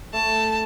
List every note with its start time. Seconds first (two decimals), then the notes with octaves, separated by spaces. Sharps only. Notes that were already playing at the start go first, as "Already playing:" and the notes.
0.13 A3 A5